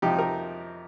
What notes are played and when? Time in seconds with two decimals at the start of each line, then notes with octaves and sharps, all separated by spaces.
0.02 F2 C3 F3 D#4 G4
0.18 G4 A#4